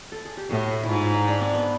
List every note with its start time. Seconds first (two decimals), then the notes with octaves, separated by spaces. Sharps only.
0.12 A4
0.25 G#4
0.37 G4
0.50 A2 F#4
0.83 E4
0.89 G#2 F4
1.01 E4
1.14 D#4
1.28 D4
1.40 C4
1.54 B3